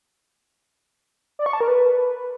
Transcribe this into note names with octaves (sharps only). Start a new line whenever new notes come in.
D5
C#6
A5
A#4
B4